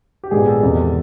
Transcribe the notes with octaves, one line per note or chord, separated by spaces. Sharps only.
G4
A#1 G#2 D#3 G#3 B3 G#4
A4
E2 C3 D#3